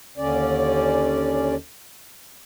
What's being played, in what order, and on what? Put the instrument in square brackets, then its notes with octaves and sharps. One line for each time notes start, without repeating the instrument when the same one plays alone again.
[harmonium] D#2 D3 C#4 D5